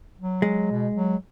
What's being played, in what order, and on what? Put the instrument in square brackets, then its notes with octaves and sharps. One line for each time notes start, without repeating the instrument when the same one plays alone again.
[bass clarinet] F#3
[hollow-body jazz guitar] G#3
[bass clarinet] B2
F#3